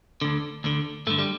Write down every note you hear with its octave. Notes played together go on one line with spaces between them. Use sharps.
D2 D3
D2 D3
G2 D3 A3
G3